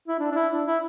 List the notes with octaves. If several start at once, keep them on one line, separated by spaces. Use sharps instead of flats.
E4
D4
D4
E4
D4
E4